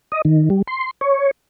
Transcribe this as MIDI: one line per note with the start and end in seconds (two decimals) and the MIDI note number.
0.12 0.22 75
0.25 0.49 51
0.50 0.62 55
0.68 0.91 84
1.01 1.31 73